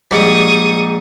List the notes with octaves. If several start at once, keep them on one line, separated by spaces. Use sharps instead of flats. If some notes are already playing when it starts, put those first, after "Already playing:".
A#1 G#2 G3 C#6 D#6